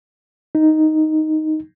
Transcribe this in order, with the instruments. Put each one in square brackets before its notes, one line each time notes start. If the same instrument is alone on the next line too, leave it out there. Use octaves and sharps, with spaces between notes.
[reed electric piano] D#4